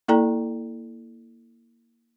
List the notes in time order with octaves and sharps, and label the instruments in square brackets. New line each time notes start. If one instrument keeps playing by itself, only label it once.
[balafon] A#3 E4 A4 D5 G5 A#5